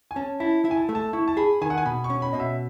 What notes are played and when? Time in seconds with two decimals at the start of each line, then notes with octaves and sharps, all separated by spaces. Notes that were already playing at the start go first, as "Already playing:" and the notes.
0.11 G#5
0.16 C#4 A5
0.40 E4 A5
0.65 E4
0.71 G#5
0.77 A5
0.89 A3
0.95 A5
1.13 E4 C#6
1.28 A5
1.37 G#4 B5
1.62 D#3 G#5
1.70 F#5
1.78 G#5
1.86 B2 B5
2.04 C#6
2.10 C#4
2.22 B5
2.33 B2 D#5
2.40 E5